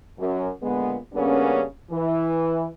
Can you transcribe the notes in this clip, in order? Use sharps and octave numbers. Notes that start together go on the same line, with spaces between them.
F#2
A#2 D3 G#3 B3
C#3 G3 A#3 B3 C#4 D4
E3